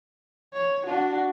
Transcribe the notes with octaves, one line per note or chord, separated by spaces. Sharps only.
C#5
D4 F#4